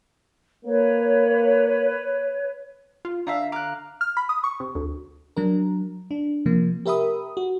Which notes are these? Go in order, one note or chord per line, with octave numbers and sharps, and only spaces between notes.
A#3 B4 C#5
F4
D3 E5 F5 A#5
F5 A#5 D6 F#6
F6
B5
D#6
C#6
C3
D2
F#3 D4 A#4
D4
C3 F3 A#3
G4 A#4 E5 B5 D#6
F#4